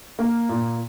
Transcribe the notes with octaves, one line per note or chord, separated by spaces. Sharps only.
A#3
A#2